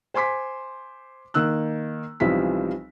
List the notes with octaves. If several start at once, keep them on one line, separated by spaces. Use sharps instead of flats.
C5 G#5 C6 D6 B6
D#3 A#3 E6 F#6
B1 E3 F3 G3 C4 B6